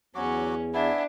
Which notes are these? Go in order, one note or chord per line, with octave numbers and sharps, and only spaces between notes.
E2 F#3 C#4 F#4 D6
B3 D4 E4 E5 G#5